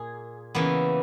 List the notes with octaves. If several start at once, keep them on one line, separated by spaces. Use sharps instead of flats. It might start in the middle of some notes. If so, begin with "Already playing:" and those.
Already playing: A#2 A#3 G#4
C#3 E3 A#3 B3